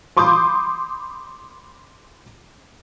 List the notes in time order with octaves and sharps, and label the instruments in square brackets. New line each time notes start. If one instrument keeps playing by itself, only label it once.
[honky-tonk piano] B5 C6 D6 D#6 G6